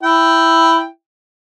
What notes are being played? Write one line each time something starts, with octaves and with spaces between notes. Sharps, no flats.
E4 G5